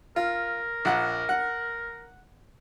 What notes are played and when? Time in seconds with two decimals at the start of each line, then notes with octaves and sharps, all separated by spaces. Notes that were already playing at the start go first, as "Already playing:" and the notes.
0.16 F4 A#4
0.85 A#1 F#5
1.29 F#5